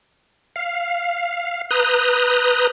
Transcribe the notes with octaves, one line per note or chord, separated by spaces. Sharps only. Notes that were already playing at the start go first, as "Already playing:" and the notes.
F5
B4 A#5 D#6 F#6 G6